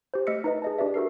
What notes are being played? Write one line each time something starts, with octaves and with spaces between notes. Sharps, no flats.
G4 C5
A3 D#5 E6 F6 B6 C#7
D#4 B4 D#5
G#4 D#5 A5
D4 G4 B4 D5 E5
F#4 A4 A#4 C7